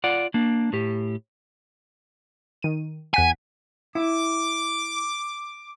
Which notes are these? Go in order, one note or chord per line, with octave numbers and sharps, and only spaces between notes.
F4 D5 F#5
A#3 D4
A2 G4
D#3 D#7
E2 F#5 G#5 B6
E4 D6